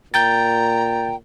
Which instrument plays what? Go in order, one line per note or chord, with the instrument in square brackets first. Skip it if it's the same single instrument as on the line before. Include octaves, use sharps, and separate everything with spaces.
[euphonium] A#2 [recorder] G5 [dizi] A#5 [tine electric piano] G6 A6